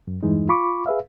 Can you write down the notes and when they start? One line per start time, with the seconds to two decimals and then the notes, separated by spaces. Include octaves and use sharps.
0.07 F#2
0.23 E2 G2 E3 G#3 D#4
0.49 F4 B5 C#6 D6
0.86 G#4 B4 E5 F5